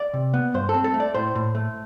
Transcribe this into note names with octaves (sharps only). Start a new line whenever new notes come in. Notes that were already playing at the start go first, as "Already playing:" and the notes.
Already playing: D5
C3
B3
G2 C5
A4
C4
A4
A3
D5
A2 C5
A2
A3